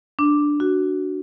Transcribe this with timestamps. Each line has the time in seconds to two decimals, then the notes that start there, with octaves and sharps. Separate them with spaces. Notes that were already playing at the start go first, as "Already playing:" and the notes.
0.19 D4
0.60 F#4